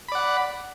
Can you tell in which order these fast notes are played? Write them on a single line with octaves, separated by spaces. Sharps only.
B5 D5 F#5